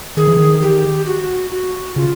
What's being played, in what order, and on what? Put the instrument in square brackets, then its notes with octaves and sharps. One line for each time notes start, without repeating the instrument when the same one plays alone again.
[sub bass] D#3 [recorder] G#4
[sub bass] E3
D#3
[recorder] G4
F#4
F#4
[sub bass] C#3 [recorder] F4